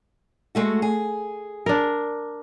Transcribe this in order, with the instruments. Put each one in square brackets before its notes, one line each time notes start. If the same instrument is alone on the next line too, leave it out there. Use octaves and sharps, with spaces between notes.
[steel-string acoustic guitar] G#3 A3 F#4
G#4
[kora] D4 A#4